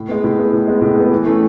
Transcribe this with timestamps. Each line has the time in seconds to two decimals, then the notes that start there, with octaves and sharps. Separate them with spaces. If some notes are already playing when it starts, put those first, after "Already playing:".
Already playing: A2
0.09 G#3 B3
0.24 A2
0.39 G#3 B3
0.53 A2
0.68 G#3 B3
0.82 A2
0.96 G#3 B3
1.12 E3
1.26 A3 C#4